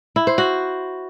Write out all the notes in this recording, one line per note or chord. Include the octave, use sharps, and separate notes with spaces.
E4
C5
F#4